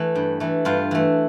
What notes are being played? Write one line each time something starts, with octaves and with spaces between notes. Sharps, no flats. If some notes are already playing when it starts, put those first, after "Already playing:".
Already playing: E3 A3
G2
E3 A3
G2 F4
E3 A3